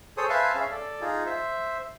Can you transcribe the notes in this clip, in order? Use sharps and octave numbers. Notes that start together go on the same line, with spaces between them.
G#4 A4 C5 C#5 D#6
B4 C5 E5 F5 G#5 A5
C#4 G#4 E5 F5
A4 D5
D#4 F4 G#4
C5 E5